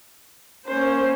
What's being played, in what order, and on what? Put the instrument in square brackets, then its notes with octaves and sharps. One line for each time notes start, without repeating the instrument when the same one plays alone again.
[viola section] A#3 C5 [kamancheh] C#4